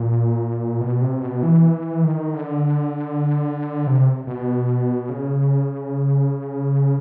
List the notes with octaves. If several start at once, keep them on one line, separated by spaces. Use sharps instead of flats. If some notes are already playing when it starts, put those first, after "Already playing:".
Already playing: A#2
B2
C3
B2
E3
D#3
D3
C3
B2
C#3